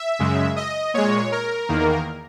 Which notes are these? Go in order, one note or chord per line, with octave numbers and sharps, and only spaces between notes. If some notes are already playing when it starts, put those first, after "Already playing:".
Already playing: E5
F#2 C#3 G#3
D#5
A#2 G#3 C#5
A#4
E2 D#3 A#3